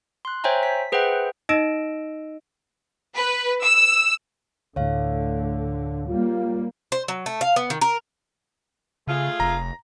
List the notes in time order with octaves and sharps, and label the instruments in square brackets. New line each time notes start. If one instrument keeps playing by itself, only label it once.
[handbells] C6 F#6
C5 C#5 E5 G5 G#5 A#5
B6
G#4 B4 C5 E5 F#5 G5
[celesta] D#4 D#5 E6 A#6 D7 E7
[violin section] B4
E6
[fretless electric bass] D2 A2 [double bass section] D3 [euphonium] A3 [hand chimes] C#5 F5
[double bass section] G3 A#3 [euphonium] F4
[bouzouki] C5
F#3
A3
F5
B3
D#3
A#4
[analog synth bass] C#3 [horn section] A3 F4 G#4
[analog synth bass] F1 [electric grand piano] A#5